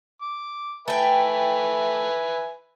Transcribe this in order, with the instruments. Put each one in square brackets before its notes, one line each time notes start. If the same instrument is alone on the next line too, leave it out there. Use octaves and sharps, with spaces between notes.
[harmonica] D6
[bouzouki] A3 G5 [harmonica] B4 E5 G#5